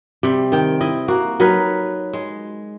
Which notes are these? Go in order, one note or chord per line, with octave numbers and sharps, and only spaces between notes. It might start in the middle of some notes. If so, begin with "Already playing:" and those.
C3 G3
D#3 G5
E4 D#5
A#3 F#4
F#3 D#4 A#4 B4
G#3